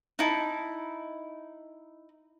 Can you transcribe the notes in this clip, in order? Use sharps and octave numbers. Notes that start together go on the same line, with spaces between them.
D#4 E4 A5